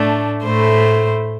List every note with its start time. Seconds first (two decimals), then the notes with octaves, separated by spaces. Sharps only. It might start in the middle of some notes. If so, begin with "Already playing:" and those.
Already playing: A2 A3 D4
0.44 A2 A3 E4 C5